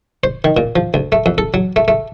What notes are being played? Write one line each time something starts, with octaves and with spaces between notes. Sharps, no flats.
C5
D#3
A#2
F3
D2
A3
F2
A4
F#3
A3
A3